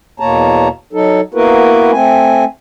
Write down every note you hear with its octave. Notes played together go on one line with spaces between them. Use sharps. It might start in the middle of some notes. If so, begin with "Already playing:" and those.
E2 B2 A#3 C#5 A5 A#5
F#3 D#4 A4
A#3 B3 E4 F#4 A#4 B4
A3 C4 G#5